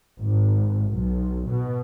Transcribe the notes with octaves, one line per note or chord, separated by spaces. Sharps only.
G#1
B1
B2